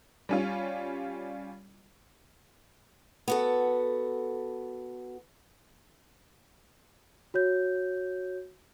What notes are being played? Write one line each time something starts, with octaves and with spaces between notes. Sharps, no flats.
G3 C#4 F4
B3 F#4 A4
F#4 C#5 G6